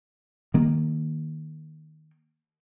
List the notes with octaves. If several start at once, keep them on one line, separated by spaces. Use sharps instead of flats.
D#3 A#3